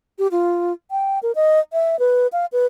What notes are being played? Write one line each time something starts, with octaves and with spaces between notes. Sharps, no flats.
G4
F4
G5
A#4
D#5
E5
B4
F5
B4